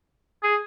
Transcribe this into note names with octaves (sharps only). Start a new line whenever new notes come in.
G#4